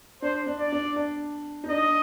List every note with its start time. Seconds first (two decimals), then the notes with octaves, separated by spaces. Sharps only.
0.22 D4 C5
0.47 D4
0.59 D5
0.72 D4
0.96 D4
1.64 D#4
1.69 D4 D#5